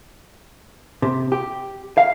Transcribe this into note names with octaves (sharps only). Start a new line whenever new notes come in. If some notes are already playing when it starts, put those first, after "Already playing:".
C3
G4
F5